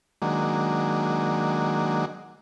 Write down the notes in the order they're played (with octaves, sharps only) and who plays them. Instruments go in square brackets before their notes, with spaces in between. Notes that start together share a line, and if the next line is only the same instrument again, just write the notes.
[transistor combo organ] D#3 F#3 G#3 A#3 D4